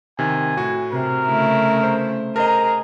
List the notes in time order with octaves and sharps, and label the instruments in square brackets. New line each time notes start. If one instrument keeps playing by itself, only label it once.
[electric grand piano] C3 D#3 [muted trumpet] G#5
[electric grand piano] A2 F#4
[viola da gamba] C3 [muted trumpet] A#4
[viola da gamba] C#3 A3 E4
[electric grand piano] C5
[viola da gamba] G#4 [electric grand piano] A#4 C5 D#5 [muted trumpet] A#5